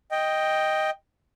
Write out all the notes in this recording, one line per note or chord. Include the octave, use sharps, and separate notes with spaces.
D#5 G5